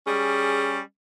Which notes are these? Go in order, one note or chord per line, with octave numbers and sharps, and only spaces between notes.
G3 C#4 G#4